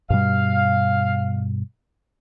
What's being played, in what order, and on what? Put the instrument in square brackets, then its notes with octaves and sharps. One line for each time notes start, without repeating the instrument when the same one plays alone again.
[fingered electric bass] G2 B2 G3 [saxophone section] F5